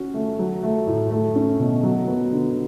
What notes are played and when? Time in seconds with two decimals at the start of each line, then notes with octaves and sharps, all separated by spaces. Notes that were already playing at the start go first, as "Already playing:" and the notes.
Already playing: C#4 F#4
0.14 A3
0.39 F#3
0.63 A3
0.87 A2
1.11 A3
1.36 C#4
1.59 B2
1.83 F#3
2.07 B3
2.32 D3